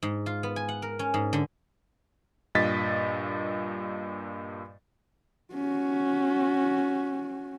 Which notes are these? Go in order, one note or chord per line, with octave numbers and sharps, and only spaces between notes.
G#2
F4
B3
G#5
F#5
A#4
C#4
G#2
D3
G2 A#2 D#5 A6 B6
C#4 F#4